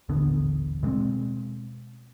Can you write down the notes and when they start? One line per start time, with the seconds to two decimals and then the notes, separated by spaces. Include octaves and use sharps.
0.09 D#1 A1 D3 B3
0.83 B2 G#3 A#3 C4